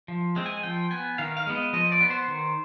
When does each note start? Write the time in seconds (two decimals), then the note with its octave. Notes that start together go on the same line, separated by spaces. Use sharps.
0.08 F3
0.36 G#3 C4
0.46 G#5
0.63 F3 G5
0.91 B3 G#5
1.18 D#3 F5
1.37 F5
1.47 G#3 B3
1.55 D#5
1.73 F3 D#5
1.92 D5
2.01 B3
2.10 C5
2.28 D#3